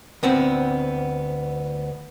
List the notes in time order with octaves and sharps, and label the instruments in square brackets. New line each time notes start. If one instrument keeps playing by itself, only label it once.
[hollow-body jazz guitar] D2 B3 C4